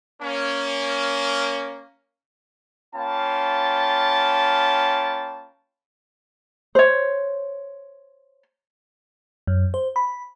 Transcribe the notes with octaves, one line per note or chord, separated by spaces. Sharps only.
A#3 C#4
A#3 C#4 F4 G5 A5 B5
C5 C#5
F#2
C5
B5